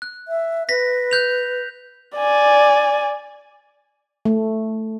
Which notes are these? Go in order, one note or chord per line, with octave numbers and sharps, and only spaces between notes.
F#6
E5
B4 A#6 B6
F#6 G6 F7
D5 G#5
A3